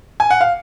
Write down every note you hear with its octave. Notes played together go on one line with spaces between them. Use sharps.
G#5
F#5
F5